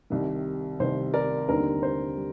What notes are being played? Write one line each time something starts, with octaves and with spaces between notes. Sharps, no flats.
C2 C3 D#3
C2 C3 D#3 C5
A#4 D5
D#2 D3 G3 C4 D#4 A#4
C5
G3